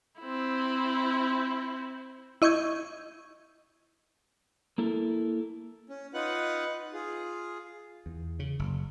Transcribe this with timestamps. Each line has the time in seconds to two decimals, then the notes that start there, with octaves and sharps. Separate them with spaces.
0.20 C4 E4
2.42 E4 D#5 C#6 G6 G#6
4.78 A#3 E4 A4 A#4
5.90 C#4
6.14 D#4 F4 B4 F#5 F#6
6.93 F4 G#4
8.06 E2
8.39 C#3
8.59 F#1